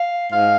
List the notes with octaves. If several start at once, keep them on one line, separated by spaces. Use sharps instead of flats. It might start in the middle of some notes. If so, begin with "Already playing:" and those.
Already playing: F5
G#2 F5